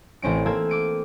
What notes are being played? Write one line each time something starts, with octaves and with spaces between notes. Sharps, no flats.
A1 C4 C#4 D7
A#3 C4 A4 E6 G#6
D6 D7 D#7